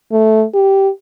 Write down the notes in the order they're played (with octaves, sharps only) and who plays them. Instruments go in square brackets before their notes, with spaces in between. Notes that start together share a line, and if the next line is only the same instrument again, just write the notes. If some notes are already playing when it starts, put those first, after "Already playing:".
[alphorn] A3
G4